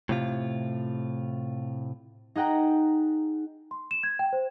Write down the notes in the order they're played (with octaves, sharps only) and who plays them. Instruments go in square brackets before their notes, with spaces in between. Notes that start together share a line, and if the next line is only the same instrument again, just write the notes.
[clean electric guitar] A2 C3 F4
[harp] D#4 G#4 F#5 G5 A#5
[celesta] C6
E7
G#6
G5
C5